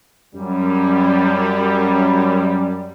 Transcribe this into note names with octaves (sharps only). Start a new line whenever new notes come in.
F#2 G3